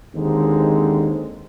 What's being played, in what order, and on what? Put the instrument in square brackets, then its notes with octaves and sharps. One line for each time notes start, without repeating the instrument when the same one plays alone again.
[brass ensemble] D#2 D3 G#3 C4 D#4